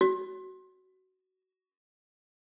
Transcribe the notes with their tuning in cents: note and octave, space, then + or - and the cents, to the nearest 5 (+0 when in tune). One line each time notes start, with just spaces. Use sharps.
F#4 +15